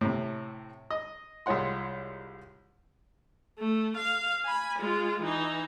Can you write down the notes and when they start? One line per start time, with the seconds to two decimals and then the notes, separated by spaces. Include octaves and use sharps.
0.01 A2 C3
0.91 D#5
1.46 C2 G#3 F4 C#5 F#5 C6
3.60 A3
3.97 F5
4.45 G#5 B5
4.79 G#3 F4
5.22 E3 D#4